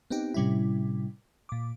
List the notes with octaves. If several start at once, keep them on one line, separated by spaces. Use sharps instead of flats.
B3 C4 D#4 G4
A2 C3 G3 C#4 E4
A#2 D6